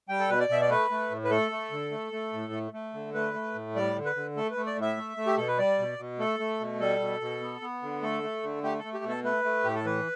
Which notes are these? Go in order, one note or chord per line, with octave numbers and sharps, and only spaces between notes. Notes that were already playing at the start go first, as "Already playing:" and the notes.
G3 G5
A4
B2 B4
D5
B2 E5
D5
A3 B4
A3
A2
B4
A3 A4
A3
D3
A3
A3
A2
A3
A3
D3
A3 B4
A3
A2
G3 D5
D3
B4
D3
A3 A4
B4
A3
D5
A2 E5
A3
A3
G4
B2 A4
B4
G3 D5
B2
B2
A3 A4
A3
B2
G3 A4
B2
B2
B3
B3
D3
A3 A4
A3
D3
A3 G4
A3 A4
G4
B2
A4
A3 B4
A3
A2 G4
A4
E3 B4